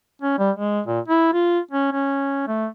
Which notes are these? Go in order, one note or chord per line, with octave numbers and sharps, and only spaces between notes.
C#4
G3
G#3
A#2
E4
F4
C#4
C#4
A3